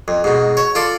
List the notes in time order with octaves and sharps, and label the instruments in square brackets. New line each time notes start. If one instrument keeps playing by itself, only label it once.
[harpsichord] F2
G#2 B2
C#5
F4 A4 D5